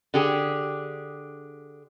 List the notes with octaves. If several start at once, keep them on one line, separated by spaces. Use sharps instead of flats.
D3 G4 G#4